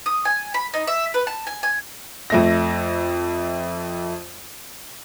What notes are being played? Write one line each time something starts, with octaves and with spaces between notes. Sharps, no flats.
D#6
G#5
B5
D#4
E5
B4
A5
G#5
G#5
F2 A3 A#6